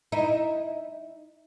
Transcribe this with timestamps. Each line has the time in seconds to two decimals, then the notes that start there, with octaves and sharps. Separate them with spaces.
0.12 D#4 E4